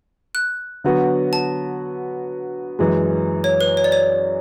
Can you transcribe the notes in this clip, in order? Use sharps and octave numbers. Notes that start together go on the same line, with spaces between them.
F#6
D3 F#3 B3 F#4
A5
F#2 E3 G#3
C#5
B4
C#5
D5
C#5